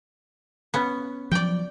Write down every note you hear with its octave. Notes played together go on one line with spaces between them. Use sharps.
B3 C#4
F3 F#3 D5 G5